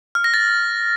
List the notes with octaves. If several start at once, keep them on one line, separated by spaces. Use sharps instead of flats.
F6
A#6
A6